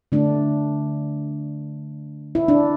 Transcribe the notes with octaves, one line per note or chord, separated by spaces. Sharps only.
D3 A3 D4
E4
D4